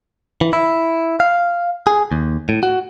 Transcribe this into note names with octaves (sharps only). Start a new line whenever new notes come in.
E3
E4
F5
G#4
D#2
A2
F#4